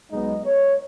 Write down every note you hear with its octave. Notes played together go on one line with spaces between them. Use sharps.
B1 B2 G#3 B3 D#4 D#5
C#5